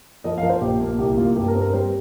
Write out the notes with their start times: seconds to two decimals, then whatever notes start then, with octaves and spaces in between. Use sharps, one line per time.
0.24 F3 D#5
0.38 F5
0.43 F3 A#4
0.49 C5
0.61 A#1 G4
0.81 A#3
0.99 C2 G4
1.17 A#3 F4
1.36 G2 G4
1.48 A#4
1.55 C4
1.62 A#4
1.73 G3 C5